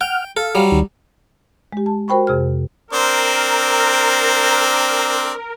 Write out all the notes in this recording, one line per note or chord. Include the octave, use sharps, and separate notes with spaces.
F#5 G5 F6
A4 F5
F#3 G3
D2 D#3
G#3 G4
A5
F#4 A#4 C5 G5 B5 C#6
F2 C3 G#4 F6
C4 D4 A#4 C5